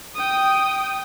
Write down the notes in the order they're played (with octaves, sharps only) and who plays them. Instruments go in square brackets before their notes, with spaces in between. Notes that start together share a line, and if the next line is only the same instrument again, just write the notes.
[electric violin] G5 D#6